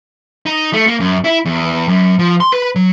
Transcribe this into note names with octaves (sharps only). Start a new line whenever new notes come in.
D#4
A3
A#3
F#2
E4
E2
F#2
F3
C6
B4
F#3